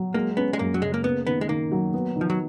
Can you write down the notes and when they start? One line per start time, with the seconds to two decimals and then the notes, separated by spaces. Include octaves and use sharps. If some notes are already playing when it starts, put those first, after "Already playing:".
Already playing: F#3
0.14 G#3 A#3
0.37 B3 C#4
0.53 G#3
0.59 F#2 A#3
0.74 F#3
0.82 C#3 G#3
0.94 A#3
1.04 A#3 B3
1.27 D#3 B3
1.41 G#3
1.49 D#3 A#3
1.71 F#3
1.94 B3
2.16 D#3
2.21 F3
2.30 F#3